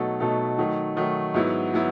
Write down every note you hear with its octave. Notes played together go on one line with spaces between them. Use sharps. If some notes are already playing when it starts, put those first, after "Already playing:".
Already playing: B2 F#3 A3 D#4 A4
B2 F#3 A3 D#4 A4
D#3 F#3 A3 D#4
D#3 F#3 A3 D#4
G#2 F#3 B3 E4
F#3 B3 E4